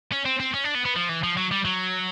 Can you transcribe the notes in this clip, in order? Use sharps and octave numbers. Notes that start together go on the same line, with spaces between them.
C#4
C4
C4
C#4
D4
B3
B3
F3
E3
F3
F#3
G3
F#3